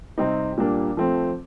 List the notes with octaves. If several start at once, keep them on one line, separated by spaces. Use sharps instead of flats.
C3 G3 C4 D#4
A#2 G3 A#3 D4
F3 A3 C4